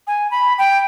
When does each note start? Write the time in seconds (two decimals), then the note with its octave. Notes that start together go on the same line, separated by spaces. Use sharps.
0.07 G#5
0.31 B5
0.58 G5